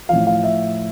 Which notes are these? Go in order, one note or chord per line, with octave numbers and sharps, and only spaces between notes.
A2 F3 F5
F5
E5